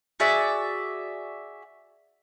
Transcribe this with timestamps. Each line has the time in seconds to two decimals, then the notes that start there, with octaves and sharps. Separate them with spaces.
0.20 F#4 G#4 D5 E5